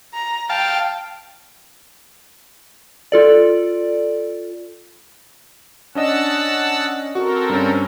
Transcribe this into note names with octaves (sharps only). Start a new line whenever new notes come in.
A#5
F5 G5 A5
F4 A4 D5
C#4 D4 D#5 F#5 A5 E6
C4 F#4 A4 A#4
G2 C#4